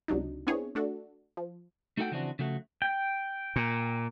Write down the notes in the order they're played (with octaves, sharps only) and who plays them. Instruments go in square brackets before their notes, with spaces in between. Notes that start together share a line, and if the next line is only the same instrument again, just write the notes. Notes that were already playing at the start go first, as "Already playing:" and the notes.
[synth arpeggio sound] C#2 C3 F#3 D4 D#4
B3 C4 D4 E4 G#4 C#5
A3 D4 F#4 A4
F3
[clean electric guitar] A3 D#4 F#4 A4 F#5 G5
C#3 E3 F3 C4 D4 F#4
C#3 F3 A3 F#4
[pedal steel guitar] G5
[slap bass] A#2